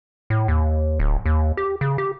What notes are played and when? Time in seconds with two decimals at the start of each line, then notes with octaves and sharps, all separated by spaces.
0.30 A2
0.48 D#2
0.99 D1
1.26 D#2
1.57 G4
1.81 C#3
1.98 G4